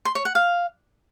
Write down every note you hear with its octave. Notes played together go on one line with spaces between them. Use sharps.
C6
C#5
F#5
F5